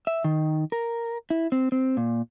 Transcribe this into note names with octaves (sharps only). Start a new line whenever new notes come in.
E5
D#3
A#4
E4
C4
C4
A#2